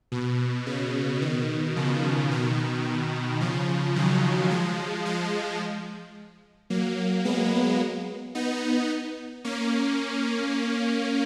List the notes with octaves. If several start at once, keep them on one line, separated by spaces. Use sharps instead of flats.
B2
C#3
B2 D#3
C#3 F3
B2 D#3
C#3 F3
D#3 F#3
F3 G#3
F3 G#3
F#3 A#3
G#3 B3
B3 D#4
A#3 C#4